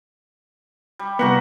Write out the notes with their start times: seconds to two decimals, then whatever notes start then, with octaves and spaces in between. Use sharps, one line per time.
0.99 G3
1.19 C2 A#3 B3 F#4 G4